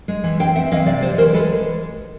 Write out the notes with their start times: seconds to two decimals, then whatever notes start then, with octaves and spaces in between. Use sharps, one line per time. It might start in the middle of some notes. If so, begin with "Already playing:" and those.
0.08 G#3
0.24 E3
0.39 C4 F5 G5
0.56 C4 E5 F#5
0.71 E3 D#5 F5
0.86 C3 D5 E5
1.02 G#3 C5 D5
1.18 E3 A#4 C5
1.33 G#3 A4 B4